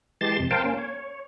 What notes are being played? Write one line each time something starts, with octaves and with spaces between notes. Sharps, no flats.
E3 G#3 G4 A5 C6 A6
F2 C3
A#4 C5 F5 G5 A5
A#3 C#4
C#5